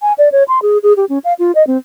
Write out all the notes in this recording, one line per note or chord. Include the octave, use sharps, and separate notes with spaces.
G#5
D5
C#5
C6
G#4
G#4
G4
C#4
F5
F4
D#5
C4